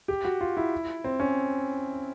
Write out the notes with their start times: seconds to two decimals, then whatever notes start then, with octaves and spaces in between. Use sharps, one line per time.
0.08 G4
0.25 F#4
0.41 F4
0.57 E4
1.04 C4
1.20 C#4